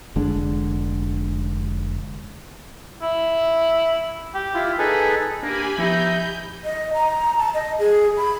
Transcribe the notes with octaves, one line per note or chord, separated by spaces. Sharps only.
F1 D3 G#3 D4
E4
G4
E4 F4
D#4 G#4 A4 B4
A#3 D4 G4 G#5 B5
F3 B3 D#4 E4 G6
D#5
A#5
A5
D#5
G#4
B5